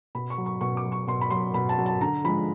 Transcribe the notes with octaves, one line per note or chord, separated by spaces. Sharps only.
B2 B5
C#6
F#3
C#6
B2 C#6
D6
F#3
C#6
B2 C6
B5
F#3 C6
B2 B5
A5
F#3
A5
D3 A#5
F3 G#3 B5